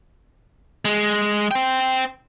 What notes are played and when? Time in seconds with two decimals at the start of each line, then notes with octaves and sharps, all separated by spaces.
0.85 G#3
1.51 C5 G5